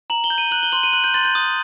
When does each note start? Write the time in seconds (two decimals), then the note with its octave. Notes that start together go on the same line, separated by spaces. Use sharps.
0.10 A#5 F#7
0.24 G7
0.30 G6
0.38 D#7
0.51 F#6 F#7
0.63 G7
0.72 C6 F#7
0.83 D#7
0.93 F#6 F#7
1.04 G6
1.14 C6 A6
1.25 G6
1.35 D#6